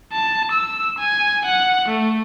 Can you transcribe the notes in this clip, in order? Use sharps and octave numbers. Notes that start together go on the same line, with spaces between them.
A5
E6
G#5
F#5
A3